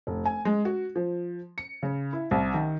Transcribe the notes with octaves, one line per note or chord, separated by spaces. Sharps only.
F1
G#5
G#3
F#4
F3
C#7
C#3
E4
C2
D#3